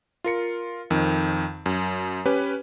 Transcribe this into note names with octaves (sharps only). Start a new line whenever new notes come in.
F4 A#4 C#7
F2 D#3
F#2
C#4 G4 B4